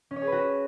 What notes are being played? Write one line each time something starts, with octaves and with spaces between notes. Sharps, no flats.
C#4
C#5
G#4
B4
F#4